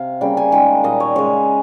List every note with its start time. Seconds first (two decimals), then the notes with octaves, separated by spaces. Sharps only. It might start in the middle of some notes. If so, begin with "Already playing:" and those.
Already playing: C3 F5
0.21 C#3 G3 A#3 G5
0.37 G#5
0.52 D#3 G#3 G5
0.84 A#2 G3 A#3 D#5
1.00 C#5
1.16 C#3 G#3 C#5